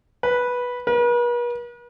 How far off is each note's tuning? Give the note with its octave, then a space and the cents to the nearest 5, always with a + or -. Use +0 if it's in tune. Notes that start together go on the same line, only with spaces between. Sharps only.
B4 -10
B4 -45